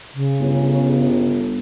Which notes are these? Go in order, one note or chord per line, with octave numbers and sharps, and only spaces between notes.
C#3
G1